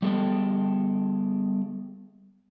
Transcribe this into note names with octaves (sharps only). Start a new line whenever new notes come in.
G3 B3 G#4 A4 D#5 G5